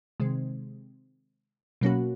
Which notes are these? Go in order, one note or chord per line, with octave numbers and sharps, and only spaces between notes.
C3 D#3 G#3 C4
B2 F#3 A#3 C#4 F#4